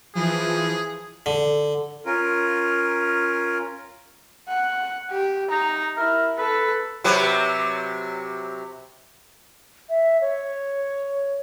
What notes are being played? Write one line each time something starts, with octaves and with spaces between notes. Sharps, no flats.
E3 F3 G#4
D3
C#4 F4 A#4
F#5
G4
D#4 A#5
E4 A#4
A4 B4
C3 F#3 B4
E5
C#5